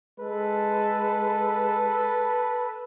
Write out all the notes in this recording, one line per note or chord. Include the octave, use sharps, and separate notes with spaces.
G#3 A4 B4